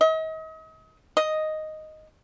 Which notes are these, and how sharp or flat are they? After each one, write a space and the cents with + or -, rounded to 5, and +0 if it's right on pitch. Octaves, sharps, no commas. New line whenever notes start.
D#5 +40
D#5 +0